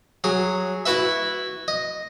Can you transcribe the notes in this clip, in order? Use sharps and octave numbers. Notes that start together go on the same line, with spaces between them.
F#3 G#4
E4 F#4 B4 E5
D#5